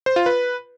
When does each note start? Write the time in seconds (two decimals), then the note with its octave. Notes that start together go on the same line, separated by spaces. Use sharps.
0.06 C5
0.16 F4
0.26 B4